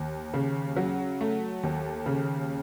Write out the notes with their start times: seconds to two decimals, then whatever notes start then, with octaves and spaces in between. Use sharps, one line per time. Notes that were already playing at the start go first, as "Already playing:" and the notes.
Already playing: D#2
0.34 C#3
0.76 F#3
1.21 A3
1.63 D#2
2.06 C#3